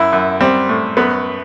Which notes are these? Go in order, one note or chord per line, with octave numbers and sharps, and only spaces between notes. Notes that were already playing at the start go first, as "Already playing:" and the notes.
Already playing: F#2 E4
F#2
G3 C4
A2
F#2 B3